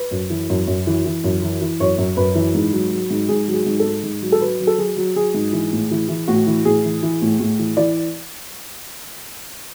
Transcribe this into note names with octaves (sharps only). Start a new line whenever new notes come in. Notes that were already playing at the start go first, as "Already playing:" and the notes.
Already playing: B4
F#2
E3
F#2
F#2
E3
E3
F#2
E3
E3
F#2 C#5
F#2
F#2 B4
E3
G#2
F#3
F#3
G#2
G#2 G#4
F#3
G#4
G#2
A4
G#2
G#2
F#3
A4
F#3 B4
F#3
A4
F#3 G#4
F#3
F#3 G#4
G#2
E3
A2
E3
E3
A2 F#4
E3
A2 G#4
E3
E3
A2
A2
E3
E3 D5